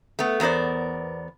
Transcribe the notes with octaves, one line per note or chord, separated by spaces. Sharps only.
A3 B3
E2 B3 A#4 C5 D5